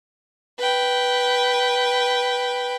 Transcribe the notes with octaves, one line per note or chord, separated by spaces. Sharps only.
B4 G5